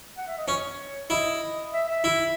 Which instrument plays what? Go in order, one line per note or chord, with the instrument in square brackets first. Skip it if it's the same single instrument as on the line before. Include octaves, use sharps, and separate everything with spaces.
[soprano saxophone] F#5
E5
D#5
[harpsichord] C#4 [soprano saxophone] C#5
[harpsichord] E4 [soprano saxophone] D#5
[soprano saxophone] E5
E5
[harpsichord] E4